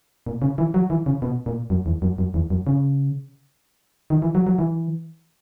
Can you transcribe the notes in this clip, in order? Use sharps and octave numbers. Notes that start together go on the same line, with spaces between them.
A#2
C#3
E3
F#3
E3
C#3
B2
A#2
F#2
E2
F#2
F#2
E2
F#2
C#3
D#3
E3
F#3
F#3
E3